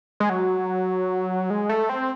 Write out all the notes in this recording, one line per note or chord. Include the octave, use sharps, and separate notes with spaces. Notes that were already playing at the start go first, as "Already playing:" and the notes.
G#3
F#3
G#3
A3
C4